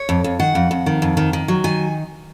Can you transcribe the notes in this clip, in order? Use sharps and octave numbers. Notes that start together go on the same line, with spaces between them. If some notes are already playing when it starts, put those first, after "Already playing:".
Already playing: C#5
F2
F2
D#3 F#5
F2
F2
D#3
F2
D#3
D#3
F#3
D#3 G#5